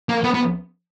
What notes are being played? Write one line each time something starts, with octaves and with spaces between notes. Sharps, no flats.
A#3
B3
B3